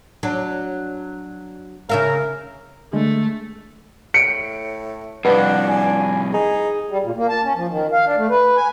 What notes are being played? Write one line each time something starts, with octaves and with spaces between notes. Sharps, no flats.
F#3 D4
C#3 A#4 E5 F5
D3 G#3 A3
A2 C#7 D7
C2 F2 D4 B4 F#5
G#5
D#4 G#4
G3
A#2
A#3
A5
C#4
F3
D#3
F5
D4
A3
B4
G#5